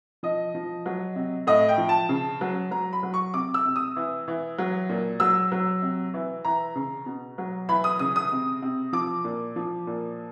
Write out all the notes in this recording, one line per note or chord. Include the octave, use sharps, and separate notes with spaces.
F3 D#5
F3
F#3
C3
A2 D#5
G5
F3
A5
C#3
F#3
F#3 A#5
B5
F#3
C#6
C3 D6
E6
C3
D#6
E3
E3
F#3
A#2
F#3 E6
F#3
C3
E3
E3 A#5
C#3
B2
F#3
E3 B5
D#6
C#3 D#6
D#6
C3
C3
F3 D6
A#2
F3
A#2